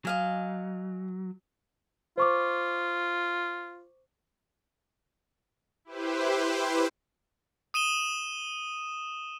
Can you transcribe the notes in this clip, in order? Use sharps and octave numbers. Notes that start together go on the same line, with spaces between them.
F#3 D#5 F5 G#5
F4 C5 C#6 D6
E4 G4 B4 C5
D#6 D#7 E7 G7